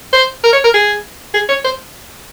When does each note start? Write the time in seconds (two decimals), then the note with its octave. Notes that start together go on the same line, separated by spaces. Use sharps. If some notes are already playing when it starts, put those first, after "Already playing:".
0.13 C5
0.44 A#4
0.53 C#5
0.64 A#4
0.74 G#4
1.34 G#4
1.49 C#5
1.65 C5